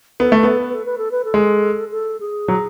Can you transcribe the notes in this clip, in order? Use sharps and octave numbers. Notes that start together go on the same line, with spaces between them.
B3 A4
A3 B4
B3 A4
B4
A4
B4
A4
B4
A4
G#3
A4
G#4
F#3